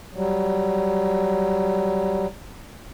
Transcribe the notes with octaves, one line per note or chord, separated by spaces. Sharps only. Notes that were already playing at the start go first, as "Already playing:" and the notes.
F#3 G3